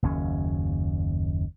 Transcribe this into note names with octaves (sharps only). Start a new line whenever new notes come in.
F#1 D#2 C#4